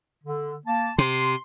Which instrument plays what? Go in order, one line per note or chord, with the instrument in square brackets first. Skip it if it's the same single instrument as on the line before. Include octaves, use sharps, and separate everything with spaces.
[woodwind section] D3
A#3 A5
[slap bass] C3 [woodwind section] C6